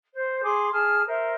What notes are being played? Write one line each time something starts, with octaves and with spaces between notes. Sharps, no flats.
C5
G#4 C6 D6
G#4 A5 F6
A#4 C5 E5